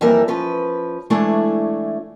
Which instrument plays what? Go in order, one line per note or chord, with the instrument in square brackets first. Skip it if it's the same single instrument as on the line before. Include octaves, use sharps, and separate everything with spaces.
[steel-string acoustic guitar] F2 E3 G3 A#3 A#4 E5
F3 C#4 B4
E3 G#3 A3 D4 E4 C#5